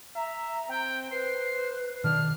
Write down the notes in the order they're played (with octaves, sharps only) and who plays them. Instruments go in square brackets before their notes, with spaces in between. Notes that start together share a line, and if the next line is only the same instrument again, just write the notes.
[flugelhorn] E5 [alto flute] A#5
[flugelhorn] C4 [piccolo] G5
[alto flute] B4 [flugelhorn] C5 [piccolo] C7
[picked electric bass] B2 D#3 [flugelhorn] D4 [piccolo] F6